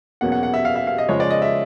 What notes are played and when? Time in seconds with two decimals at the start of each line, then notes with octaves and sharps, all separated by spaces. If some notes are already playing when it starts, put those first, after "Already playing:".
0.21 E2 B2 F#3 A#3 C#4 F#5
0.32 F#5
0.43 F#5
0.54 E5
0.65 F5
0.76 E5
0.87 F5
0.98 D#5
1.09 C#3 F3 G#3 C#5
1.20 D5
1.30 D#5
1.42 E5